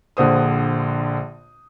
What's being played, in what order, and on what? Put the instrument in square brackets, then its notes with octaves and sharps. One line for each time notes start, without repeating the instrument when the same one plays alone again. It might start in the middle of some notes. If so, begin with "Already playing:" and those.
[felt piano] A#1 D3 C5 D#6